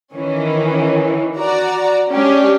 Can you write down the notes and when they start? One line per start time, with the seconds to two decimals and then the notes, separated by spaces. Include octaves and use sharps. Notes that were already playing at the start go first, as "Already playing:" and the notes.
0.13 D#3 E3 C#4
1.37 F#4 D5 A#5
2.12 G#3 C#4 D4 G4